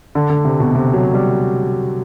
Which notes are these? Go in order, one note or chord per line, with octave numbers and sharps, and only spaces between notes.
D3
D3
C3
B2
C3
F#3
G3